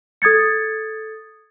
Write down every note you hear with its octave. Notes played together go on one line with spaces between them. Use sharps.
A4 D#6 G#6 A6 C#7